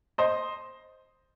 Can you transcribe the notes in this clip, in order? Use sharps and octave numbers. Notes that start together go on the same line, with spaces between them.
C5 D#5